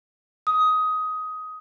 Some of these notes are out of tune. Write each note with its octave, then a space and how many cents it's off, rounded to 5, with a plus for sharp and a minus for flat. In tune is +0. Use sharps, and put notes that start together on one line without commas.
D#6 +15